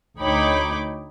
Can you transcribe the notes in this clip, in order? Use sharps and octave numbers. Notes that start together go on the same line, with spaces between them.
D2 D#4 C#5 G5 B5 D6